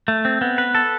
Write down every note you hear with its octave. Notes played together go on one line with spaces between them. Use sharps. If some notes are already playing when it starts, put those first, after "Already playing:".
A3
C4
B3
B4
A4